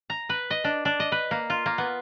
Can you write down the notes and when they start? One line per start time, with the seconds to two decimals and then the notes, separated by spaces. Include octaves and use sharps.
0.10 A#5
0.29 B4
0.50 D#5
0.64 D4
0.85 D4
1.00 D#5
1.12 B4
1.31 A#3
1.50 F4
1.66 A#3
1.78 B3